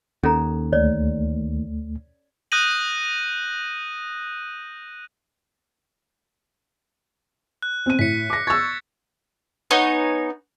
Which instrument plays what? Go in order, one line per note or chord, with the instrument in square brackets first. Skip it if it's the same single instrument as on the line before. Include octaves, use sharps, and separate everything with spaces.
[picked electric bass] D#2 [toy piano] C#4 A4 A#5
[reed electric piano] D2 A3 [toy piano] C#5 D5
[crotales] D#6 F#6 G6 A#6 D#7 F#7
F#6
[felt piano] C4 D#7
[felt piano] A2 [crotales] B6 C#7
[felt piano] D6 A#6
[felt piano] C#6 E6 [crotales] G#6 A6
[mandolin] B3 D#4 C#5 G#5